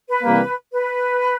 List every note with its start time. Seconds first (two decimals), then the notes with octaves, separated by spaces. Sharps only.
0.09 B4
0.24 C3 E3 G3 A#3
0.71 B4